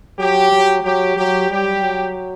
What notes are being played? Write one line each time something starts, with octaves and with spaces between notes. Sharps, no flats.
F#3 G4
F#3
F#3 G4
F#3 G4
G3 G4
F#3